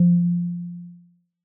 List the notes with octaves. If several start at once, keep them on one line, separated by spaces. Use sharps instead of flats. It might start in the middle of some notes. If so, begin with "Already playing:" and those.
Already playing: F3